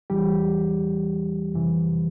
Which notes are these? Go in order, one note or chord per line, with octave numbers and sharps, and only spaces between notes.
E2 E3 G3 G4
F2 C3 E3